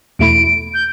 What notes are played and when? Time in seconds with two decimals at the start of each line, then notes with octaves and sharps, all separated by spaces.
0.19 E2 B2 A3 E4 D7
0.74 G6